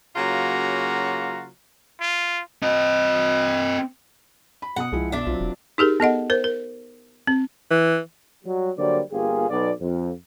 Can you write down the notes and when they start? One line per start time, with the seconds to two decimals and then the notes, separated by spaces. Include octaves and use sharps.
0.16 C#3 F#3 A#3 F4 F#4 A#5
2.01 F4
2.63 C4 D#5
4.62 B5
4.76 B2 F#5 D#6
4.92 C2 F3 G#3 E4
5.12 B2 D4 E5
5.27 B1 F#3 C4 F4
5.40 E1
5.78 D#4 G4 G#4 A#4
6.00 B3 A4 D#5 F#5
6.30 A#4 C5
6.44 A#4
7.27 C4
7.71 E3
8.44 F#3 G3
8.77 D3 F#3 G3 A#3 C5 D5
9.12 G1 A#3 F4 G4 G#4
9.49 B1 B3 D5
9.80 F2